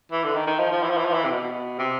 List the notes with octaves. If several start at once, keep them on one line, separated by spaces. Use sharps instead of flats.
E3
D3
D#3
D#3
F3
F3
E3
F3
E3
F3
E3
C3
B2
C3